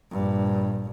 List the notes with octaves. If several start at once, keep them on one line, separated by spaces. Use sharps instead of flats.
A#1 G2